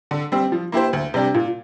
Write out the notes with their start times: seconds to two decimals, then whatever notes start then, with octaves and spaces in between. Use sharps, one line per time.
0.11 D3
0.32 G3 C4 G4
0.52 F3
0.72 A#3 E4 G4 C5
0.93 D2
1.14 C3 G3 D4 G4
1.34 A#2